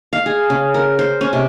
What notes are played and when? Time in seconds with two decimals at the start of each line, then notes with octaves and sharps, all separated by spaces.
0.13 F5
0.26 G#4
0.50 C#3
0.74 A#4
0.99 C5
1.21 C#4
1.33 C3